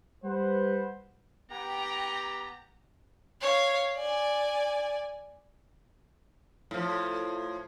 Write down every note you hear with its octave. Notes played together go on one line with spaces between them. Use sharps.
G3 B4 C5 F#5
B3 G4 G5 A#5
C#5 F5
D5 G#5
A2 F3